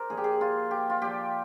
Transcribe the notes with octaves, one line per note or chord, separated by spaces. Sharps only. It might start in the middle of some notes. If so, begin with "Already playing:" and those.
Already playing: A#4 C5 D5
A#2 F3 G#4
G4
G#4
F4
G4
F4
A#2 F3 G4